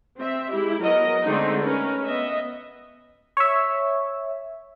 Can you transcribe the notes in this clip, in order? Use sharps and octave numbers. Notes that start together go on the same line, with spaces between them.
C4 E5
G#3 E4 G4
F#3 B3 A#4 D#5
D3 G#3 A3 C4 D4 D#4
C#4 A#4 B4
B3 D#5 E5
C#5 E5